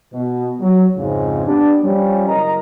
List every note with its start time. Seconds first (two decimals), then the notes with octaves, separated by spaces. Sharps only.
0.12 B2
0.60 F#3
0.96 F2 G#2 C#3
1.46 B3 D4 G4
1.83 F3 G3 C#4
2.27 F#1 A#4 D#5 A#5